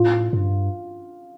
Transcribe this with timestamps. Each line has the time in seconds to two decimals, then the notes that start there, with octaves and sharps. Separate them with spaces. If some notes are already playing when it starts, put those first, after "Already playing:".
Already playing: A2 F4
0.33 G2